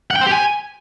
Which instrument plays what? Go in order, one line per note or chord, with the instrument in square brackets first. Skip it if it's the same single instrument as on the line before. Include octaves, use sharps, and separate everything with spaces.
[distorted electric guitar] F#5
G5
C5
G4
G#5